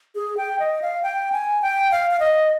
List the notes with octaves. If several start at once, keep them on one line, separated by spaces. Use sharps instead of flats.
G#4
G5
D#5
F5
G5
G#5
G5
F5
F5
D#5